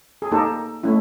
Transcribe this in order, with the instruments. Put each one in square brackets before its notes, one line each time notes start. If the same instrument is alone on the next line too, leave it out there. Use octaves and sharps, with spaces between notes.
[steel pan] G#4
A#3 D#4 G4 A4
A3 C#4 E4